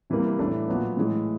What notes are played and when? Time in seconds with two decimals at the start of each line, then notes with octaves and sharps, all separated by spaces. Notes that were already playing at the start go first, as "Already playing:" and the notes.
0.10 C3 E3 G3 A#3
0.39 A2 E3 A3 D4
0.68 A#2 F#3 B3
0.97 A2 E3 G#3